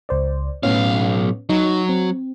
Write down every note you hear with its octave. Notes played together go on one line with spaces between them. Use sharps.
C#2 C5 D5
B1 A2 B3 C#4 F5
F#3 D#4
C4